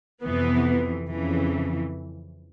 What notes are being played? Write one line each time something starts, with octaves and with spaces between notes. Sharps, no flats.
F2 C3 E3 B3
F2 C#3 E3